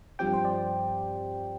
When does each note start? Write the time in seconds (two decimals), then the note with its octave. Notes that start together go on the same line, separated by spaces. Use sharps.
0.19 G2 F3 C4 G4 G5
0.33 C5
0.45 D5